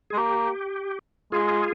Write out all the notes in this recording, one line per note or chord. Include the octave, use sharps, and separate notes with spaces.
G#4
G#3
A#3 G4
G#3 F4 G#4